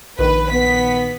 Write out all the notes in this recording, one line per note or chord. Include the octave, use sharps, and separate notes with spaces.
A#1 D#3 B4
B3 B6